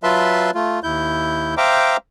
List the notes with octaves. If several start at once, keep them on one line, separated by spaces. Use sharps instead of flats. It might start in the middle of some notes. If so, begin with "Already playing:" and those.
F#3 F4 B4 E5 A5 C6
A3 F4
D#2 E4 G6
C5 E5 F5 G5 A#5 D6